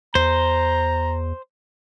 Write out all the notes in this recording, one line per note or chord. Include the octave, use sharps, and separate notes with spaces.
E2 C5 A#5